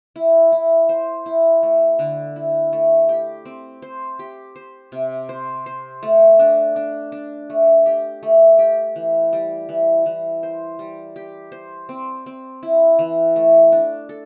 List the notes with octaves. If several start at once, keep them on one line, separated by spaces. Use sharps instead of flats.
E4
E4
C5
E4
A3
D3
E4
A3
G4
C4
C5
G4
C5
C3
C5
C5
A3
D4
D4
D4
A3
G4
A3
G4
E3
G3
E3
E3
C5
G3
G4
C5
C4
C4
E4
E3
A3
D4
A4